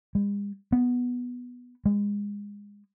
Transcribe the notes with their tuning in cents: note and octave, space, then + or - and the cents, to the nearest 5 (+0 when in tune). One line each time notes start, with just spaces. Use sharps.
G#3 -45
B3 -5
G#3 -25